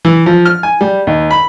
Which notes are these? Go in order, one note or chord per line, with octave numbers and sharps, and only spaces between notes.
E3
F3
F6
G#5
G3
D#2
B5